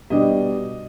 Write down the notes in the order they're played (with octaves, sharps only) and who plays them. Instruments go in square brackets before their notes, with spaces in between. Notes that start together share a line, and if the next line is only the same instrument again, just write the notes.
[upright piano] B2 G3 D4 D#5